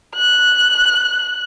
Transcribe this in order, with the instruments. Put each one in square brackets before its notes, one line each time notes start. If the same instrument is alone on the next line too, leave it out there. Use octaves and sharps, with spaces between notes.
[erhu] F#6